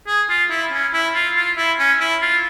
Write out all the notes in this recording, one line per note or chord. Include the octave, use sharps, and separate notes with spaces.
G#4
F4
E4
C#4
E4
F4
F4
E4
C#4
E4
F4